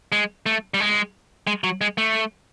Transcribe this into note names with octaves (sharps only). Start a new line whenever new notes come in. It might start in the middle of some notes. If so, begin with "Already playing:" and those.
G#3
A3
G3
G#3
G#3
F#3
G#3
A3